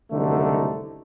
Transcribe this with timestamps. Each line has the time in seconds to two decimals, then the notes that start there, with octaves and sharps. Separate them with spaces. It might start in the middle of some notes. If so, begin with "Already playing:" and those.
0.12 F#1 C2 D3 D#3 A3 D#4